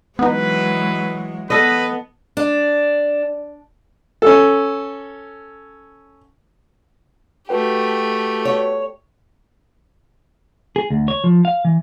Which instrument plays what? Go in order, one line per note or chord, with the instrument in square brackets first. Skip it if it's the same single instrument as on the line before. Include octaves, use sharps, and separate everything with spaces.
[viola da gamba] E3 F#3 G#3 [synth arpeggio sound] B3 D#4 [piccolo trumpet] B4
[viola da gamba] B3 [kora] A4 D#5 [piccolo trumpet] B4
[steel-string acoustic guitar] D4
[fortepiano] C#4 A4
[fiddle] A3 G4 [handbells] F#4 B4 G5
[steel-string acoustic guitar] C#5
[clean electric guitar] G#4
D2
C#5
F3
F5
E3